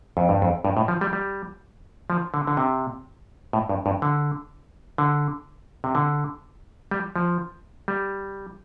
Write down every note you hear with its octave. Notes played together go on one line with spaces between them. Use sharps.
F2
G2
F2
G2
A2
F3
G3
G3
F3
D3
D3
C3
A2
G2
G2
D3
D3
C3
D3
G3
F3
G3